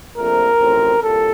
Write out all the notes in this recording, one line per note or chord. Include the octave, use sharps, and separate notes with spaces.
A#1 A#2 F3 A3 C4 A#4
A1 A2 F3 C4
C2 A#2 A4